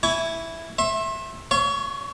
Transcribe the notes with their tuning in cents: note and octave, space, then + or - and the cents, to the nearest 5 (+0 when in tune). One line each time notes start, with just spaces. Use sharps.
E4 +0 G#5 +0 C#6 +40
E5 +0 C6 +40
C#5 +30 F5 -35 C#6 -15